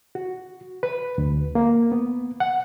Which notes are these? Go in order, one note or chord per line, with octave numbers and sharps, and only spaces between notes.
F#4
B4
D2
A#3
B3
F#5